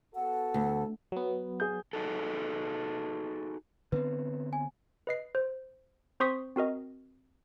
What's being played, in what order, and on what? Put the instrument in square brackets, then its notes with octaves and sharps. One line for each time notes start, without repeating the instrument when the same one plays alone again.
[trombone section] B3 F#4 A4 [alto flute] F#5
[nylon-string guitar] D2
[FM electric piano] F#3 B3
[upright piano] G#4 G6
[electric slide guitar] D#4 F#4 G#4 A4
[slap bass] D3 B3 C4 [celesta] B4
[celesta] G#5
[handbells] B4 D#5 C7
C5
C4 C5 C6 C#6 D#6 B6
C4 F#4 A#4 D#5